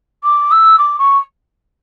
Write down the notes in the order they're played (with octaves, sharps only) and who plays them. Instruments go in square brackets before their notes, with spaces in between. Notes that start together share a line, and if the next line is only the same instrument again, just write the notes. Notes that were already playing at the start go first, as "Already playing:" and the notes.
[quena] D6
E6
D6
C#6